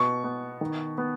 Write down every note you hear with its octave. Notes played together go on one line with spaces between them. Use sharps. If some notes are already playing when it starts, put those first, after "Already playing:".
Already playing: B2 C#6
B3
D#3
B3